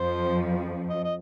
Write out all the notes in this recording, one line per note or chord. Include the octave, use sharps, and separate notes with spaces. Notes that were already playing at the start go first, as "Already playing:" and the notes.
Already playing: F2 F3 C5
D#5
D#5